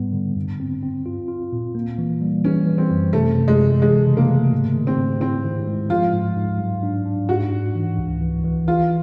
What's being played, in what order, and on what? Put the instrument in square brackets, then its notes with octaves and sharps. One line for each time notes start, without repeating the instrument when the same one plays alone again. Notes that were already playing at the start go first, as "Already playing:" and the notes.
Already playing: [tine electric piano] G#2 G3 B3
D3
G2
C4
C4
F4
F4
A#2
A#3
E3
G3
[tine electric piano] E3 [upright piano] C#4
[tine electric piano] E3
[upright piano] C4
[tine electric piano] F#2
[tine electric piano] C3 [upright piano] A3
[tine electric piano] C3
[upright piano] G#3
[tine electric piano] C3
[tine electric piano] E3 [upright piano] G#3
[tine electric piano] C#3
[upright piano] A#3
[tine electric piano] A3
G#2
D#3
[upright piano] C4
[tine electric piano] G#2
[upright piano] C4 [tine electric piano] E4
[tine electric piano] D#3
G#3
[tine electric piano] F3 [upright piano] F4
[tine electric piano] G#2
G#2
F#3
D4
D4
[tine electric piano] G#2 [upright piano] F#4
[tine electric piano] G#2
E3
C#2
E3
E3
[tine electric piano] E3 [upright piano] F4